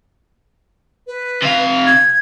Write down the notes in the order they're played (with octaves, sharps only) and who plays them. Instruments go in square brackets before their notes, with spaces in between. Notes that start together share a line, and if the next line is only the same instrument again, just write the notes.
[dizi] B4
[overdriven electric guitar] C3 F5
[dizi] G#6